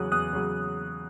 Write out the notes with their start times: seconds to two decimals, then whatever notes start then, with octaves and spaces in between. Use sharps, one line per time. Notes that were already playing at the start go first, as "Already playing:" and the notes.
Already playing: E2 C#3 F#3 D#6 F#6
0.12 E2 D#6 F#6
0.33 C#3 F#3